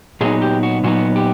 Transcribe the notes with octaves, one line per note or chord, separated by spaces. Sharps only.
A#2 F#3 B3 D#4 G#4
G4
F#4
A#2 F#3 B3 D#4 F#4
G4